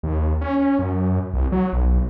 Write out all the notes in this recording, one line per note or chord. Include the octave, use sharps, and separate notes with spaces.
D#2
C#4
F#2
C2
F#3
B1